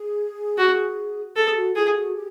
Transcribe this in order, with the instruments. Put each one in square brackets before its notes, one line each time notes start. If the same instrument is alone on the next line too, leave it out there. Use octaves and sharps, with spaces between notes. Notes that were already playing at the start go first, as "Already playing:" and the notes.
Already playing: [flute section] G#4
[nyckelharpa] F#4
[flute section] G#4 [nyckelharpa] A4
[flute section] F#4
[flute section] F4 [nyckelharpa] G#4
[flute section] F#4
G4